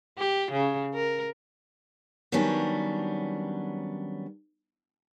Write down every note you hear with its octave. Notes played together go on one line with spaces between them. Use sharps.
G4
C#3
A#4
D#3 F#3 G3 B3 C#4 D4